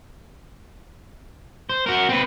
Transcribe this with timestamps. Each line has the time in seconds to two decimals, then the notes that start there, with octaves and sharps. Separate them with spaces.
1.69 C5
1.86 F#4 A#4
2.09 C4 B4